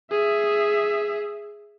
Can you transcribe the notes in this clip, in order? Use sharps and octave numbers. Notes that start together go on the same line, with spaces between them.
G#4 E5